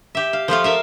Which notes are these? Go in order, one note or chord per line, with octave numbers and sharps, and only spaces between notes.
G4 E5
F5
F3 A3 F4 F5
A#4 E5 F5